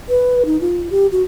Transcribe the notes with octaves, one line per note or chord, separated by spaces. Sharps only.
B4
D#4
F4
G4
F#4